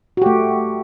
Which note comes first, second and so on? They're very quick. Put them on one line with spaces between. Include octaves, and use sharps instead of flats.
F#4 G4 A3